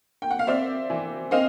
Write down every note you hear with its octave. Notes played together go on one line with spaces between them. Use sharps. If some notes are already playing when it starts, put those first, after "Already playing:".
G5
F#5
F5
C4 D5 E5
E3
C4 D#5 F5